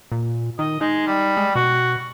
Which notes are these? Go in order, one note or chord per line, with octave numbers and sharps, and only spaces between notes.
A#2
D#3 D#5
G#3 D#4
G3
G#3
B2 F#4